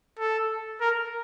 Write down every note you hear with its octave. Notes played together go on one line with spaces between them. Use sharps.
A4
A#4